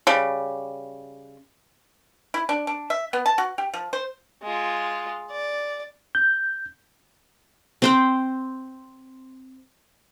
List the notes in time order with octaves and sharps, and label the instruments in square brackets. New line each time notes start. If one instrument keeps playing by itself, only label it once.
[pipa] C#3 G3
E4
D4
D4
E5
B3
A5
F#4
G4
F3
C5
[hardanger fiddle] G#3 F4
D5
[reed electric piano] G6
[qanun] C4 C5 G5